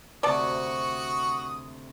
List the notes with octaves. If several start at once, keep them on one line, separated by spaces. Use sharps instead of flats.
D2 C3 F#4 D5 A5 B5 C#6 D#6